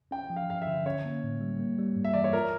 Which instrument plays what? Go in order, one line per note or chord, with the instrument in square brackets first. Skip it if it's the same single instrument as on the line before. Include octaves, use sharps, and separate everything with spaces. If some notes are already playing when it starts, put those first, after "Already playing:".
[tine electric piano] C#4 [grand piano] G5
[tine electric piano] F3
[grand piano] F5
[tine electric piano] G2 [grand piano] F5
[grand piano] E5
[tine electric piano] D3
[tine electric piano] C#4 [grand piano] C#5
[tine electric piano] A#3
A2
G3
A#3
G3
G2
[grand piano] E5
[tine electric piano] E3 [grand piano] D5
[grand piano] C#5
[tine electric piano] F4 [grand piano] A#4